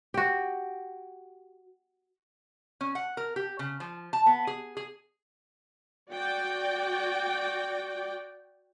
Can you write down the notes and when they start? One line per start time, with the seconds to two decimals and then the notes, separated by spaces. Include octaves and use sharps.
0.14 F#4 G4
2.81 C#4
2.95 F#5
3.17 A#4
3.36 G4
3.59 C#3
3.80 F3
4.13 A5
4.26 B3
4.47 G#4
4.77 G#4
6.11 F#4 D5 G5